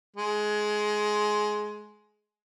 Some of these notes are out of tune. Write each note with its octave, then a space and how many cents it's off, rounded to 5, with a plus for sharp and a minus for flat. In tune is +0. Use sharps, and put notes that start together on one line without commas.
G#3 +15